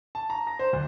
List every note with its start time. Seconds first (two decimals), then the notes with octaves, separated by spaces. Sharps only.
0.15 A5
0.30 A#5
0.47 A#6
0.59 C5
0.73 D2